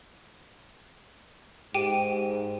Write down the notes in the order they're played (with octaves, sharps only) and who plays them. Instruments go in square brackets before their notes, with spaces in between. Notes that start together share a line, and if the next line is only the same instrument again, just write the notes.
[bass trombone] G#2 [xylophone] G4 G5 D#7